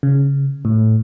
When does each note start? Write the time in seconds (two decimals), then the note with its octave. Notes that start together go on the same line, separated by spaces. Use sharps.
0.03 C#3
0.65 A2